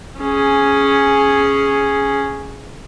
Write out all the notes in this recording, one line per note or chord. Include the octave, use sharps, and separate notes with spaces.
C#4 G#4